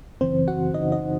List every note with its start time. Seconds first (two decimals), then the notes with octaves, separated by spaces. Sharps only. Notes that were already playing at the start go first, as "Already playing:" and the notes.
0.21 F#2 C#3 E3 C4 C5
0.48 F#4 F#5
0.74 F#2 C#3 E3 D#4 D#5
0.92 D#4 D#5